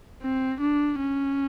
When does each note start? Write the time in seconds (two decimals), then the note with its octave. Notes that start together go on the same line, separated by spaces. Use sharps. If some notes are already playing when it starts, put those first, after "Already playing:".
0.22 C4
0.60 D4
0.99 C#4